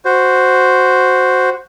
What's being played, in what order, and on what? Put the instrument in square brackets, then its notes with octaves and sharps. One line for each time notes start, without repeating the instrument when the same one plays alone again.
[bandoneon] F#4 C5